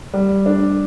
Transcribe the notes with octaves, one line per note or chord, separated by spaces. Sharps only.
G3
D4